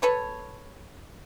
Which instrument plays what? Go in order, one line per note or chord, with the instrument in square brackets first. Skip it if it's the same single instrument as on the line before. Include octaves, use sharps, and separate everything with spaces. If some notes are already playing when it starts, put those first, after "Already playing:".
[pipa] A4 B4 C#5